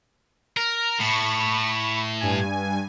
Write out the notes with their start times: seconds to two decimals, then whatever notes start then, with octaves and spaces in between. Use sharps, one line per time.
0.57 A#4
0.99 A2 B5 C#6 E7
2.20 G2 G#5